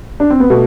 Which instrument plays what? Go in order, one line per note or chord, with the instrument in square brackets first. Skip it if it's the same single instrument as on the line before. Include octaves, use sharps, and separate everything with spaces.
[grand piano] D4
C4
B3
[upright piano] B2 [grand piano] A3